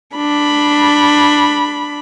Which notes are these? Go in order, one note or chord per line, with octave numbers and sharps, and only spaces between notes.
D4 B5